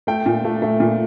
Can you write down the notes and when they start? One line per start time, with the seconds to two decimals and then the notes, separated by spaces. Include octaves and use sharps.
0.07 A3 G5
0.26 A#2
0.44 A3
0.62 A3
0.80 A#2